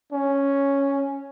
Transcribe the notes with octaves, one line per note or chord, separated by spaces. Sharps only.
C#4